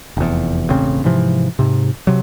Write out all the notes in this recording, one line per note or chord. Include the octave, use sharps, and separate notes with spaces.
F1 E2
E1 A1 C#3 C4
G#2 C3 E3 F3
G#2 C3
C3 F#3